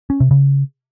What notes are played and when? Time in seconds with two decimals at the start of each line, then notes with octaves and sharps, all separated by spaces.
0.10 C#4
0.20 C3
0.31 C#3